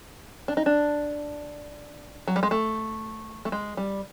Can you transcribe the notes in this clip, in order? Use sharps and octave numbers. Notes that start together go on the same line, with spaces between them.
D4
D#4
D4
F#3
G3
G#3
A3
A3
G#3
G3